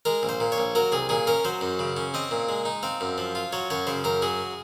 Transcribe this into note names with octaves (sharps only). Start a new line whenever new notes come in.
G#3 A#4
A#1
C5
A#2
C#5
A#1
F#3 A#4
C2 G#4
A#2 G#4
C#4 A#4
F#3 C5
F#2
C#3
C#4
C4 D#5
A#2
G#3
D#4
C4 F5
F#2
F3
F4
F#3 C#5
F#2 C#5
C#3 C5
F#2 A#4
F#3 G#4